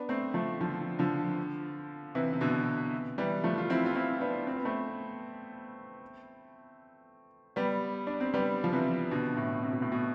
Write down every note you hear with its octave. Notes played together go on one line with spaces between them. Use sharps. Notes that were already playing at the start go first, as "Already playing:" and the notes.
Already playing: B3 D4
A3 C4
F3 A3
D3 F3
D3 F3
C3 E3
C3
B2 D3
E3 G3
F3 A3
F4
C4 E4
F4
C4 E4
B3 D4
C4
B3
A3 C4
G3 B3
D4
C4
G3 B3
F3
C3 E3
B2 D3
A2
C3
B2
A2
B2